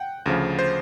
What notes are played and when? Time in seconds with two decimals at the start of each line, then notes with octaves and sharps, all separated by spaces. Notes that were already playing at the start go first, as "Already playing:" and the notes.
Already playing: F#5 G5
0.26 D2 C#3 F3
0.59 C5